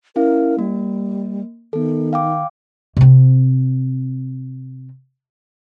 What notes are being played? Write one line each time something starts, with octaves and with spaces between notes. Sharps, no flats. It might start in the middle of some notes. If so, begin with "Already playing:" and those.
C#4 E4 A#4 F5
G3 A#3
D#3 B3 A4
F5 G5 D6
C3 C4